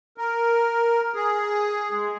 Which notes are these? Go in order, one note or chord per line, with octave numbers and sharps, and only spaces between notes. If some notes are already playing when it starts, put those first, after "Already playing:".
A#4
G#4
G#3